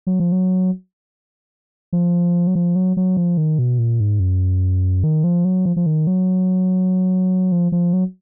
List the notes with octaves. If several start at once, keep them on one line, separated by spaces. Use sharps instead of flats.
F#3
F3
F#3
F3
F#3
F3
F#3
F#3
F3
D#3
B2
A#2
G#2
F#2
D#3
F3
F#3
F3
F3
D#3
F#3
F3
F3
F#3